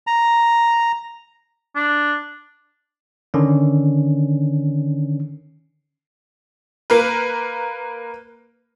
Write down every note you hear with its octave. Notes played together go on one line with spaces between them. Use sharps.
A#5
D4
D3 D#3 C#4 D4
A#3 A#4 B4